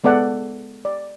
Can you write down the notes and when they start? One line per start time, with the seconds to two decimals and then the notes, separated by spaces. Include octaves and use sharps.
0.04 G#3 B3 A4 D5 F#5
0.85 D5